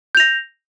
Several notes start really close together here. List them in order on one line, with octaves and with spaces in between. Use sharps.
G6 F7 A#6